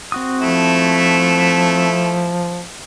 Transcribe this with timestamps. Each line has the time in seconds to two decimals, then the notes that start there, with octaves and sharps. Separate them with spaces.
0.12 C4 F#4 D#6
0.40 F3 A3 E4